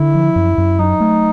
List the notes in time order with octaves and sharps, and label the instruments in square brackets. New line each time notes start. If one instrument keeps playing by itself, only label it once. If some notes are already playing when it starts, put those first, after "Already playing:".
Already playing: [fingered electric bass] D3 [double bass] E4
[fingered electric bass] F3
F#2
F#2
[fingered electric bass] F#3 [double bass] D#4
[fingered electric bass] A3